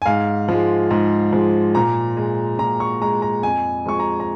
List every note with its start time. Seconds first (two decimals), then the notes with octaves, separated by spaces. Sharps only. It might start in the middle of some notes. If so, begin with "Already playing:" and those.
0.02 G#5
0.06 G#2 F5
0.48 F3 G#3
0.90 G#2
1.33 F3 G#3
1.75 A#2 A#5
2.17 G#3
2.59 A#2 A#5
2.80 C#6
3.01 G#3 A#5
3.22 A#5
3.43 F2 G#5
3.86 F3 G#3 C#6
3.99 A#5
4.20 A#5